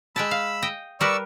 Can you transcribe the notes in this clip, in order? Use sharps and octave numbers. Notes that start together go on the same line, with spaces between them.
G#3 G5 A5 B5 E6
F5
D#5 G5
G3 A#4 B4 D5 C#6 E6